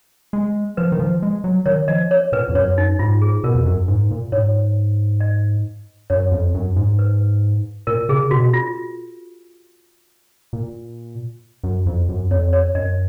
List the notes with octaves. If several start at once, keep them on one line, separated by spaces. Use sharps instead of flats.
G#3
F3 B4
D#3
F3
G#3
F#3
D#3 C#5
F3 D#5
C#5
A#2 B4
F2
F#2 C#5
D#4
G#2 F4
G#4
B2 A#4
F2
F#2
G#2
A#2
G#2 C#5
D#5
F#2 C#5
F2
F#2
G#2
B4
A#2 A#4
C#3 G#4
B2 F#4
F4
A#2
F#2
F2
F#2
F2 C#5
C#5
F#2 D#5